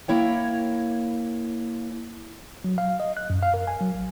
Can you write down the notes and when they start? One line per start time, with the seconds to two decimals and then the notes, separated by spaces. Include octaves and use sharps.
0.08 A#3 E4 C#5 G5
2.64 F#3
2.78 F5
3.00 D#5
3.17 F#6
3.30 F#2
3.42 F5
3.54 A#4
3.67 G#5
3.81 F#3
3.95 A1